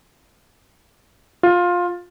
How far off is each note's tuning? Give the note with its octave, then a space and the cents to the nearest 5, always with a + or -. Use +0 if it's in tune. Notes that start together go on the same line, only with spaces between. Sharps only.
F4 +15